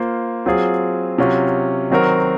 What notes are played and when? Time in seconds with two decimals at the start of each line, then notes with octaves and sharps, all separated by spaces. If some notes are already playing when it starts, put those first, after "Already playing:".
Already playing: A#3 F4 C5
0.46 F#3 C4 F4 G#4
1.18 C3 F#3 C#4 F4
1.90 D#3 F#3 C4 F#4 A#4